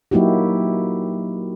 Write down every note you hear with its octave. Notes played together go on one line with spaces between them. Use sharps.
F#3 A#3 D#4 E4 F#4 G4